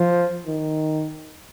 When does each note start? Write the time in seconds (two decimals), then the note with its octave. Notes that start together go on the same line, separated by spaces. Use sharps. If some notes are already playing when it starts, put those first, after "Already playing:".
Already playing: F3
0.46 D#3